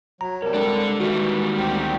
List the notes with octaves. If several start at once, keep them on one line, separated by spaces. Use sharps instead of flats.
F#3 A#5
C3 G3 A#4 C#5 A5
G#3 D4 A4
D#3 E3 G3 F#4
D2 C4 G4